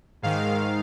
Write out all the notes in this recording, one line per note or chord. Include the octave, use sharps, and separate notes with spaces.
G#2 D#3 F5